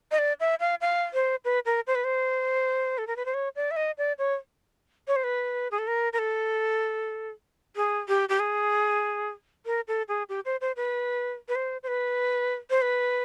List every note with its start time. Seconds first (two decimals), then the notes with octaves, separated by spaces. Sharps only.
0.11 D#5
0.18 D5
0.40 E5
0.60 F5
0.81 F5
1.13 C5
1.45 B4
1.66 A#4
1.87 C5
1.95 B4
2.04 C5
2.98 A4
3.07 A#4
3.16 B4
3.26 C5
3.34 C#5
3.56 D5
3.71 E5
3.76 D#5
3.98 D5
4.18 C#5
5.07 C#5
5.16 C5
5.24 B4
5.71 G#4
5.79 A4
5.87 A#4
6.13 A#4
6.19 A4
7.76 G#4
8.08 G4
8.29 G4
8.39 G#4
9.66 A#4
9.88 A4
10.08 G#4
10.29 G4
10.45 C5
10.61 C5
10.76 B4
11.48 B4
11.55 C5
11.83 C5
11.88 B4
12.70 C5
12.82 B4